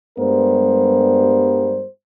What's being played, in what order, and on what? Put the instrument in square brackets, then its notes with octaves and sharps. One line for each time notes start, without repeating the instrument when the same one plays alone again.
[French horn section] G2 G3 G#3 B3 A#4 C5